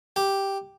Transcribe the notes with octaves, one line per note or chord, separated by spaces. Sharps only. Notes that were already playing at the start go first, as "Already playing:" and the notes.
G4